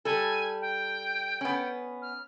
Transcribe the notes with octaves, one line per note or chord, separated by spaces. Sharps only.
G3 A4 G#5
G5
B3 C#4
F6